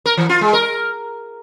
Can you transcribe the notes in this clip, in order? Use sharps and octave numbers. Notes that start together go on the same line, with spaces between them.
A#4
E3
F4
G#3
A#4